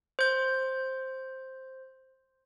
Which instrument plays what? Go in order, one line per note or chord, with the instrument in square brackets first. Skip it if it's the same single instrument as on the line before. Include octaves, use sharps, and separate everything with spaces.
[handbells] C5 G6